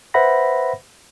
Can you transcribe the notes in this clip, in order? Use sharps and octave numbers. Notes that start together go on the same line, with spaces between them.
B4 C5 E5 F#5 B5 A#6